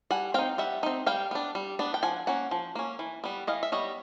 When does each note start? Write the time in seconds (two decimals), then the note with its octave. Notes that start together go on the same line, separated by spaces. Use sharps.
0.11 G3 F#5 G#5
0.34 C4 D#4 F5 G5
0.58 G3 E5 F#5
0.83 C4 D#4
1.06 G3 F5 G5
1.31 B3 D4
1.55 G3
1.79 B3 D4
1.94 G5
2.03 F3 F#5 G#5
2.27 A#3 C#4 F#5
2.51 F3
2.75 A#3 C#4
2.99 E3
3.24 G3 B3
3.47 E3 D#5 F5
3.63 E5
3.72 G3 B3 C#5 D#5